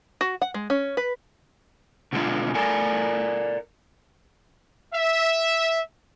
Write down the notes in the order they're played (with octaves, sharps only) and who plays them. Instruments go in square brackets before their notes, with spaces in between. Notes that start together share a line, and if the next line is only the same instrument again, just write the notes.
[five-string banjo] F#4
F#5
G#3
C#4
B4
[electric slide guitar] B2 D3 F3 F#3 G#3 F4
A4 A#4 D5 G#5
[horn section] E5